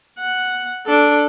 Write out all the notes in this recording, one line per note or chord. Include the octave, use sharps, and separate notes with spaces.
F#5
D4 A4